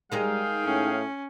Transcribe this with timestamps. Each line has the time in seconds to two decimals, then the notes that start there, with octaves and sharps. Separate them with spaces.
0.12 D#3 G3 G#3 D#4 G#4 F5 G5
0.64 A2 C#4